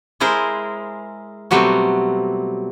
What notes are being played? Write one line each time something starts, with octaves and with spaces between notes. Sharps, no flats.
G#3 E4 G#4 A#4 C5
B2 F#3 G3 A3 C4